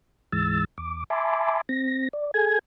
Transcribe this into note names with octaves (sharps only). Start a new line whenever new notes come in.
D2 G#2 E3 G#3 E6 A6
E2 D6
E5 G#5 A5 B5 C6 D6
C4 A#6
D5
G#4 A4 G#5 G#6